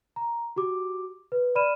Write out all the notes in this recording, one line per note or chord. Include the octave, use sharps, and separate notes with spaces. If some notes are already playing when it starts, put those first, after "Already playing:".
A#5
F#4 G4 D6
B4
D5 B5 F6 D#7 E7